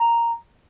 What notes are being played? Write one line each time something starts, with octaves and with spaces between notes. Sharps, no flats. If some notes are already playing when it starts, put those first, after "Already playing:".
Already playing: A#5